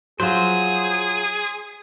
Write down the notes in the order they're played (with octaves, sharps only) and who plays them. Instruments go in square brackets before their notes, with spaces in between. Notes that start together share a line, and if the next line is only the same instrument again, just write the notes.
[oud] F#3 F4 [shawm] G#4 [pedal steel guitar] C5